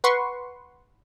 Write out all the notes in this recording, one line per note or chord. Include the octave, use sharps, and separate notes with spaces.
B4 F#5 C6 C#6